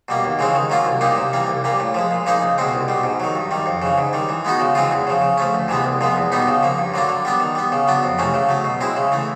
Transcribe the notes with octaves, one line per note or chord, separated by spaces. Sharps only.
B2 G3 A#3
D#2
C#3 E3 G#3 C4
D#3
F#3 A#3 C#4 F4
C2
A#2 G3 A#3 D#4
C3
E3 G3 A#3
C2
A#2 G3 A#3
A2
F3 G#3
A#2
F3 A#3 D#4 G#4
C#2
B2 G#3 C4
C2
B2 G3
G#2
D#3 F#3
G2
D#3 G3
F2
C#3 E3
G#2
D#3 G3
E3
G#3 B3 D#4 F#4
C#3
E3 G#3 C4 F4
E2
C#3 F3
C#3
F3 A3 C#4
D2
C3 E3 G#3 B3
C2
A#2 F3 G#3 B3
E2
B2 G3 B3 D#4
C#3
F3 A#3
G2
D3 F#3 A#3 D4
D3
G3 B3 D4
D#3
G3 B3
C#3
F#3 B3 D4
F2
C3 E3 A3 C#4
C#3
F#3 A3
B2
G#3 C4 E4
C#3
E3 A3